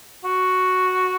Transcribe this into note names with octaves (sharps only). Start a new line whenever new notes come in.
F#4